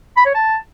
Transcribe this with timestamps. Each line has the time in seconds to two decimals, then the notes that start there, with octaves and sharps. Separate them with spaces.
0.17 B5
0.26 C#5
0.35 A5